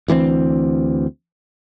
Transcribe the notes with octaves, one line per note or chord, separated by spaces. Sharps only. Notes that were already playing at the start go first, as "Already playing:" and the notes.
D2 E3 B3 C4